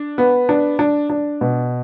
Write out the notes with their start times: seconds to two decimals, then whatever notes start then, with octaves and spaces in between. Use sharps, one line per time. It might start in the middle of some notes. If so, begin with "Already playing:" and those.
Already playing: D4
0.18 B3
0.49 D4
0.79 D4
1.10 D4
1.41 B2